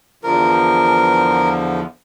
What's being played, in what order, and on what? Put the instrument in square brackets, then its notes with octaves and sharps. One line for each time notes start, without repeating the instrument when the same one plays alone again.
[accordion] E2 D3 F3 [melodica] A#4